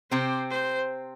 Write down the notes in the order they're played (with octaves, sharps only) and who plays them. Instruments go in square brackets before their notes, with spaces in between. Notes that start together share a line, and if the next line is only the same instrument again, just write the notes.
[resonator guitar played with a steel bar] C3 C4 [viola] C5
[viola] C5